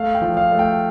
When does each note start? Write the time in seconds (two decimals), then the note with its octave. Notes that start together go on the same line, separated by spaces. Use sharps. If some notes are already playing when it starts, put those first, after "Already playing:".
Already playing: A3 F5
0.15 G5
0.22 F3
0.37 F5
0.52 A3
0.59 G5